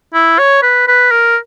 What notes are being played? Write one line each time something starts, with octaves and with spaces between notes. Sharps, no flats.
E4
C#5
B4
B4
A#4